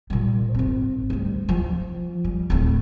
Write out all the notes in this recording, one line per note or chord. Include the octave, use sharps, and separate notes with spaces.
A#2 G3
G#1 C4
D2 G3
F3
G3
D1 A3